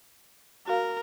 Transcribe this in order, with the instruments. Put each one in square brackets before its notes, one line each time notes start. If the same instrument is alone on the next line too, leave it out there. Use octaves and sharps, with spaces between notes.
[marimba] F#4 F5 [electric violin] A#4